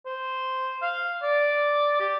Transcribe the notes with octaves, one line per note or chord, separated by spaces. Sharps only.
C5
F5
D5
G4